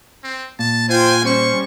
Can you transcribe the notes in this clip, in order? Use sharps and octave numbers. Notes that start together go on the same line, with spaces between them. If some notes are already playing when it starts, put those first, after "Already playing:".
C4
A#2 A5
F4 C5 G5 G#5
G3 C#4 C5 C#6